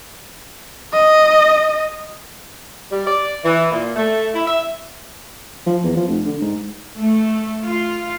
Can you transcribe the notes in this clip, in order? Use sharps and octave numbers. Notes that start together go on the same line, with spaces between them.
D#5
G3
D5
E3
A#2
A3
E4
E5
F3
E2
F3
F1
D3
G#2
A3
F4